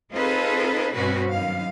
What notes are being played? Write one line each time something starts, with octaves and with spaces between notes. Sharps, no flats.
C4 D#4 F4 G#4 A4 B4
G2 B2 C4 C#4 F#4 B4
F#2 D#3 F5